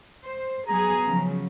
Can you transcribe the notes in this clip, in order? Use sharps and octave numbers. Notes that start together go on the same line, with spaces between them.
C5
F#3 B3 G#4 A#5
C#3 F3 F#3